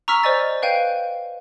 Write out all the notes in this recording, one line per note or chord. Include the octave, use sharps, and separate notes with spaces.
A#5 C#6 E6 F6 B6
C5 D5 D#5 G#5 A6
B4 F5 G5 G6 D#7